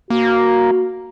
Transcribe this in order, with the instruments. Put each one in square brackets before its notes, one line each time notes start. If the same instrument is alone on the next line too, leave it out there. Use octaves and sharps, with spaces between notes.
[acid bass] A#3 [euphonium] F#4